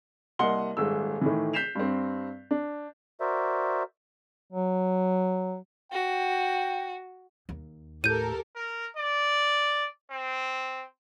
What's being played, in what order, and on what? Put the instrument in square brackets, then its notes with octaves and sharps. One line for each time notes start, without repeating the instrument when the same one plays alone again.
[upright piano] C2 A#3 D#5 F#5 C6 G7
D#1 G#2 E6
A2 D#3 E3
G6 B6 C7 E7 F7
G2 C4
D4
[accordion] F#4 A#4 C5 D5 E5
[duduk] F#3
[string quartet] F#4 [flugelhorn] G5
[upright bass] D#2
[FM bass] A2 [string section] G4 A4 A#4 [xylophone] G6 D#7
[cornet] A#4
D5
C4